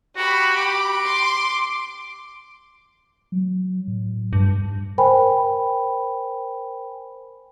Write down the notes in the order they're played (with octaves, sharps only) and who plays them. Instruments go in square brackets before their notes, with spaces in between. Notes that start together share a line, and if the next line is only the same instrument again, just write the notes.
[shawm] F#4 [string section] G4 B5
[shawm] D6
[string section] C6
[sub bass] F#3
A2
[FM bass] G2
[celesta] A#4 C5 G5 G#5 B5